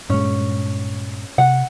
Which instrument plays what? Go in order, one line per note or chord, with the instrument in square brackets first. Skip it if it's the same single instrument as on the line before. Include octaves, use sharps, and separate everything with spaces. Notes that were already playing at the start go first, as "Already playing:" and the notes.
[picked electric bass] G2 A#2 G#3 [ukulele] C#4
[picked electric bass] C3 [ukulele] F#5